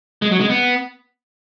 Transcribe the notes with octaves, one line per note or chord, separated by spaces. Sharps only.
G#3
F#3
G#3
B3